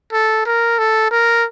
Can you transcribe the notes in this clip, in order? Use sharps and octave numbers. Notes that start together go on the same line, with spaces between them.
A4
A#4
A4
A#4